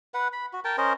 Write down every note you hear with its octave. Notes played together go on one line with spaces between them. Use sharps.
B4 F#5
B5
F#4
A#4 G5 A5
C#4 A#4 C5 D#5